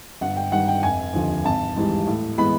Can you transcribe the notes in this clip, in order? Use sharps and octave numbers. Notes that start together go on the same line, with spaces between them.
G1 F#5
G5
G2 D#3 F#5
G5
F1 G#5
D#2 D3 F3
G#1 A5
G#2 E3 G3
A2
E3 G#3 B3 B5